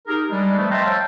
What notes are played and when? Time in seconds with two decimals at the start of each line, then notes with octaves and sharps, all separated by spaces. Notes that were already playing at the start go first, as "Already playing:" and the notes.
0.07 D#4 G4 G#4 A#4
0.30 G3 G#3 D4
0.57 F3 A3 B3
0.71 D#5 E5 G5 A5 A#5 C6
0.84 C5 C#5 F5 G5 A5 E6